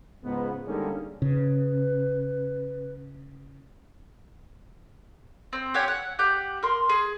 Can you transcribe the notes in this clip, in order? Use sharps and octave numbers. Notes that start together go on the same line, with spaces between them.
C#2 G#2 B3
D3 G3 G#3 A#3 C#4 D#4
C#3 B4
C4
G4 C#5 F#5 G#5
F#5
G4 F#5 G6
A#4 C6
G#4